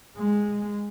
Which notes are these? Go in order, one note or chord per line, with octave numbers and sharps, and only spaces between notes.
G#3